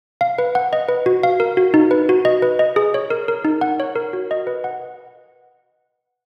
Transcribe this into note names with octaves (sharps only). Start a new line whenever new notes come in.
F5
B4
F#5
D#5
B4
F#4
F5
A#4
F#4
D#4
B4
F#4
D#5
B4
D#5
G#4
C#5
A#4
A#4
D#4
F#5
C#5
A#4
F#4
D#5
B4
F#5